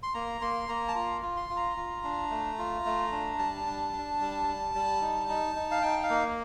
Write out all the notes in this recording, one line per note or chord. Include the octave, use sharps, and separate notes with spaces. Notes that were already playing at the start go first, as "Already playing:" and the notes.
C6
A#3 A#5
A#3 C6
A#3 A#5
A5
F4 A#5
F4
C6
F4
A#5
F4
D4
A3
F4
A3
D4
G3 A5
D4
D4
G3
G3
G3
D#4
D#4
D#4
F5
D#4 G5
F5
A#3